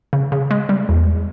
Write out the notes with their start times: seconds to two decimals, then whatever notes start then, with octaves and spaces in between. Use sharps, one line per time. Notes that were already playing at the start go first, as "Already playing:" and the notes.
0.13 C#3
0.32 C#3
0.51 G#3
0.69 G3
0.89 E2